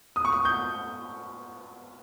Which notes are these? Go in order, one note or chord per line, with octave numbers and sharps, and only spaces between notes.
D#6
C#6
D#6
G6